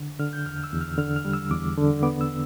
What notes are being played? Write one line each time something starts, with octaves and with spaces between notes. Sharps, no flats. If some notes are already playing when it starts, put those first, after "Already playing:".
Already playing: D3
D3 F6
G6
E2 F6
E6
E2
F6
D3 F6
F6
G3
E6
E2 D6
D3
B3 D6
E6